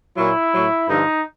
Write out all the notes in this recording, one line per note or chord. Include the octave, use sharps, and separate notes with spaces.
A#2 F#3 E4
A2 F#3
G2 D3 F3 D#4